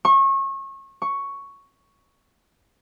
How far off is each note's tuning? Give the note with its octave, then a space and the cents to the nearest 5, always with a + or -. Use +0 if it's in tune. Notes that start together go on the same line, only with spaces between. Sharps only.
C#6 -30
C#6 +5